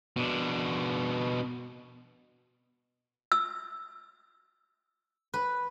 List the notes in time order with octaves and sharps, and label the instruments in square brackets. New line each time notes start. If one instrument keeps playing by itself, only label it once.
[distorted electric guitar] B2 D4
[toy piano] E6
[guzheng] B4